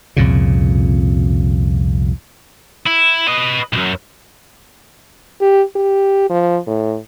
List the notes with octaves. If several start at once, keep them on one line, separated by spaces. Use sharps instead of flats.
C2 F2 A#2 C#3
E4
B4 D#5
B1 F#2
G4
G4
F3
A2